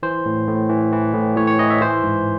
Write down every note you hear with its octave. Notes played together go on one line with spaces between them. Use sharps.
E3 C5
A2
A2
E3
E3
A2
A2 C#5
C#5
E3 D#5
E5
E3 C5
G#2